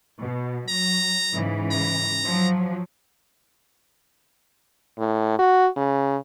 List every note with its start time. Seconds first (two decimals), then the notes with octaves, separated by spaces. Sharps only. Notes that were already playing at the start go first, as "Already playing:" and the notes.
0.21 B2
0.69 F#3 A#5
1.33 G#2 C#3 E3
1.71 A#5
2.26 F3 F#3
4.99 A2
5.39 F#4
5.77 C#3